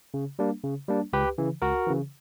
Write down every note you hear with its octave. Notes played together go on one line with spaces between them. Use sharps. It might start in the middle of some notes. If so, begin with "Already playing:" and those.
C#3
G3 A#3 D4
C#3
G3 A#3 D4
C#2 G4 B4
C#3 E3
C#2 F#4 A#4
C#3 E3